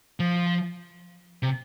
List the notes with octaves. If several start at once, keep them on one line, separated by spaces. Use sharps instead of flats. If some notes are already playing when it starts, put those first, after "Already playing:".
F3
C3